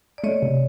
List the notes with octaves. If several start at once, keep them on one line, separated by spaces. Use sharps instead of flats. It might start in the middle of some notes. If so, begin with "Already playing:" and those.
D5
A3 C#5 D#5
C3